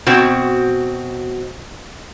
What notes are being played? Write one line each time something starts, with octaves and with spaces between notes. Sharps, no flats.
B2 C4 F#4